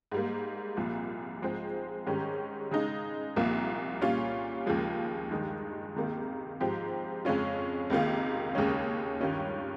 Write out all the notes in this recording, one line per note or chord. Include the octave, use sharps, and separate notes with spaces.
G#2 G3 A#3
C2 A#2 F3
G#2 F3 G#3 C4
G#2 D#3 G3 C#4 G4
C#3 G#3 D#4
C2 A#2 F3 A#3
A#2 G3 C#4 F4
D#2 C#3 F3 G#3
G2 D#3 G#3 D#4
C#2 C3 D#3 A#3
G#2 F3 C4 G4
F2 C#3 G#3 C#4 F4
C#2 C3 D#3 A#3 F4
D#2 C#3 G#3 C#4
G2 D#3 G3 C#4 F4